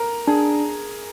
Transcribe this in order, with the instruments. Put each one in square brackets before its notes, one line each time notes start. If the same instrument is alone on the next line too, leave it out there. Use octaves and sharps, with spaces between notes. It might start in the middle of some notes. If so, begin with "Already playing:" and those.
Already playing: [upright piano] A#4
[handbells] D4 [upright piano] G#4